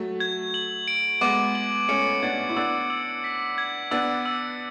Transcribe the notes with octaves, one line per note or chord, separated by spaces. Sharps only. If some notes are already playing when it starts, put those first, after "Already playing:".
Already playing: F#3 A3
G#6
F#7
D7
G#3 B3 D6
F#7
A3 C#4 C#7
B3 D4 G#6
E4
B3 D4 E6
E6
B6
G#6
B3 D4 E6
E6